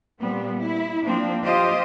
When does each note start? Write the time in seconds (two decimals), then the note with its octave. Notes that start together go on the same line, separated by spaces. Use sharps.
0.21 A#2 G3 B3 C4
0.61 E4
1.06 F3 A#3 C4 D4
1.44 F4 G4 C5 D#5